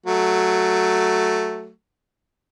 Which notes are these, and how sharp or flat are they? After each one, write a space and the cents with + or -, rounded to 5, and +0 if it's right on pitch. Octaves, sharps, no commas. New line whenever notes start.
F#3 +0 A3 +0